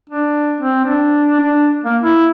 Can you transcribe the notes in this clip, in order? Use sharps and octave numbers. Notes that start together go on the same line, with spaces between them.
D4
C4
D4
D4
A#3
E4